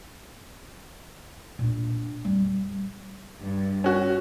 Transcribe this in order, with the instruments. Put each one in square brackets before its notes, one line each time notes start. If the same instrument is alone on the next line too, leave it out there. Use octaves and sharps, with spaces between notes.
[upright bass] A#2 D4
F2 G3
[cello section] G2
[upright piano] C#4 F#4